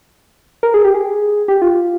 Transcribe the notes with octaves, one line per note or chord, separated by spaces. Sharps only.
A#4
G#4
G4
G#4
G4
F4